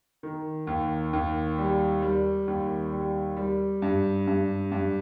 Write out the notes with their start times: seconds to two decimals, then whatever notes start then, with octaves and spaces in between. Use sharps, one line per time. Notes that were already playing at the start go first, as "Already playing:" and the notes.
0.23 D#3
0.67 D#2
1.13 D#2
1.58 G3
2.02 G3
2.48 D#2
2.93 G3
3.37 G3
3.82 G2
4.27 G2
4.72 G2